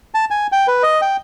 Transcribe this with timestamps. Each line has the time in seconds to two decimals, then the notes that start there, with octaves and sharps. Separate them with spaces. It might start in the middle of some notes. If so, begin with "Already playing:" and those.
0.14 A5
0.31 G#5
0.52 G5
0.68 B4
0.83 D#5
1.02 G5